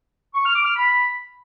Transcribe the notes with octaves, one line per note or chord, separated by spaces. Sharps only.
C#6
F6
D6
F6
B5